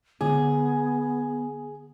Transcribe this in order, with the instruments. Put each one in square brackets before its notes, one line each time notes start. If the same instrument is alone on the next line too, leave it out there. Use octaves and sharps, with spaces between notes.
[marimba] D3 [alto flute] B3 [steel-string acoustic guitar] G#4